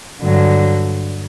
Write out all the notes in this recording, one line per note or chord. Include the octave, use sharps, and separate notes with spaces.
G2 D3 F#3